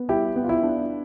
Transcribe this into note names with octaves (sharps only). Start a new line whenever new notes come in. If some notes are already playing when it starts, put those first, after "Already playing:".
Already playing: B3
G3 E4 G4
B3
F4
E4
D4